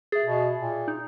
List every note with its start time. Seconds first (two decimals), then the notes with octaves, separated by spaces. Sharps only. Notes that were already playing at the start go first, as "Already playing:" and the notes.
0.12 G#4 E5 A6
0.25 B2
0.60 A#2
0.88 D#4